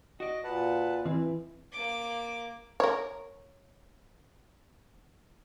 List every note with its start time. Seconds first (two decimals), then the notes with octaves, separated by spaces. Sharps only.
0.20 F#4 D5 D#5
0.44 A#2 B4 F#5 A5
1.06 E3 C4 E4
1.72 A#3 D6
2.80 A#4 C#5